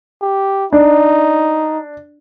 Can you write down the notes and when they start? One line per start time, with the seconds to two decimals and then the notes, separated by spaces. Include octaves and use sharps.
0.22 G4
0.73 D4 D#4